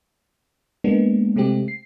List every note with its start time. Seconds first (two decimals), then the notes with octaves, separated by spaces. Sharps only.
0.84 G#3 A#3 B3 D4
1.36 C3 G#3 A3 C4 G4
1.68 C7